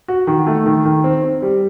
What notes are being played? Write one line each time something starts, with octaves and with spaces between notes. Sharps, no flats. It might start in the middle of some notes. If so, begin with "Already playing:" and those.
F#4
D#3
A3
D#3
D#3
C4
C4
G3